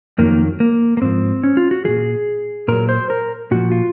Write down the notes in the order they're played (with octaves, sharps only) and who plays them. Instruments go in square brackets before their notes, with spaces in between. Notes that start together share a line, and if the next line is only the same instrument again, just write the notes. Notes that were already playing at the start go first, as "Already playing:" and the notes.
[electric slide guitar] F2 D#3 F#3 A#3
A#3
A#3
G#2 F3 C4
C#4
F4
F#4
A#2 F3 G#4
A#2 F#3 A#4
C5
A#4
A#2 F3 F#4
F4